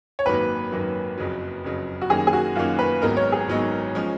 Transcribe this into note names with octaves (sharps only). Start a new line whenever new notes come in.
C#5
G#1 F#2 D#3 F#3 A#3 B4
G#1 F#2 D#3 F#3 A#3
F#1 F2 C#3 F#3
F#1 F2 C#3 F#3
F#4
F#2 D#3 A#3 C#4 G#4
G#4
F#4
F#2 D#3 A#3 C#4 F4
B4
G#1 G#2 F#3 B3 D#4 A#4
C#5
G#4
G#1 G#2 F#3 B3 D#4
F3 G#3 C#4